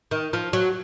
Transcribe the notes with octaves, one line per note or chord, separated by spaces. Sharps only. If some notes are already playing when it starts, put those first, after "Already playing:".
D#3
F3
F#3